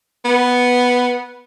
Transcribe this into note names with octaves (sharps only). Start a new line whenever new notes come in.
B3